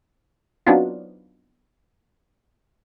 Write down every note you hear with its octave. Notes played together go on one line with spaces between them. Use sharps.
F#3 B3 C4 D4 D#4 F4